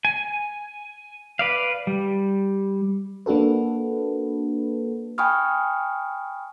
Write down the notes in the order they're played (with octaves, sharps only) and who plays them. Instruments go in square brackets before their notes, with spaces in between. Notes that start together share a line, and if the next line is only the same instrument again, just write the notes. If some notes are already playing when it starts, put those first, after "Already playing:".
[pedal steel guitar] G#5
B4 D5 F5
G3
[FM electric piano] A#3 D4 F#4 A4 B4
[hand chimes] G5 G#5 B5 C#6 D#6 F6